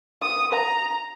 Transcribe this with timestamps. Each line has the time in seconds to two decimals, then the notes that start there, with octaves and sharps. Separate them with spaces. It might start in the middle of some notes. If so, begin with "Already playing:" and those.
0.22 D#6
0.53 A#5